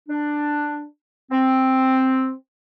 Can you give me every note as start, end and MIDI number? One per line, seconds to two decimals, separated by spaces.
0.09 0.85 62
1.31 2.33 60